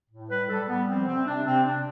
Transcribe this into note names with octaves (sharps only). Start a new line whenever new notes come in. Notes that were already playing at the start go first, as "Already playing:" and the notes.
A2
G3 B4
G3 A4
G3 B3
F3 C4
C3 C4
C3 D4
C3 C4
C3 D4